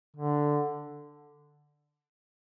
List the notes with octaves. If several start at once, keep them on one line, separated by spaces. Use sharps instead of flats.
D3